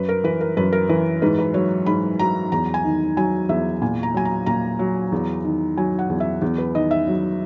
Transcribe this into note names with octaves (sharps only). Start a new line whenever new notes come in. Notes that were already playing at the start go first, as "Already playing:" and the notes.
Already playing: F#2 B4
A#4
E3 B4
A#4
F#2 B4
A#4
E3 B4
G#2 B4
B4
F#3 C#5
G#2 B5
F#3 A#5
E2 A#5
G#5
D#3
F#3 G#5
E2 E5
A#2 G#5
A#5
F#3 G#5
A#5
A#2 A#5
F#3
E2
D#3
F#3 G#5
F#5
E2
E5
E2
B4
D#3 D#5
E5
F#3